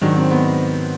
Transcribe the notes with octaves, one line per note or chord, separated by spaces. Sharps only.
G#2 D#3 F#3 D4
C4
B3